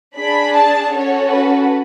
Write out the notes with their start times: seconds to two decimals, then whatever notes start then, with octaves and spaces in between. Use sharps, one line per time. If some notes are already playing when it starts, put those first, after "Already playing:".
0.17 D4 G#4 B5
0.55 A5
0.92 C#4 F#4 A4 C#5
1.30 B4